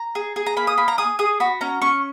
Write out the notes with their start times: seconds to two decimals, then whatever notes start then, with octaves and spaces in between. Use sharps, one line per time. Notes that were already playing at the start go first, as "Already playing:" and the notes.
Already playing: A#5
0.15 G#4
0.36 G#4
0.46 A#5
0.57 A#3 B5
0.67 D#6
0.77 A#3 B5
0.88 A#5
0.98 G#4 D#6
1.19 G#4 D#6
1.40 F#4 B5
1.61 C#4 A#5
1.82 C#4 C#6